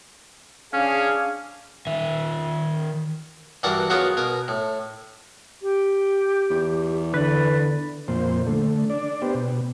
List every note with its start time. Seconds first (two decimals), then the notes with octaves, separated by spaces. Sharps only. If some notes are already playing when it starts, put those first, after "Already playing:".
0.73 C#4 D4 G#4 F5
1.87 D#3 E5
3.63 G2 E3 F#4 A#4 D5 F#5
3.90 F#3 B3 F4 F#4 G#4 A#4
4.17 B2 A#4 G#5
4.48 A2
5.61 G4
6.50 E2
7.14 D3 B4 D5
8.08 F2 A#2 C5
8.47 D3 A3
8.90 D4 D5
9.22 B3 G4 C5
9.35 B2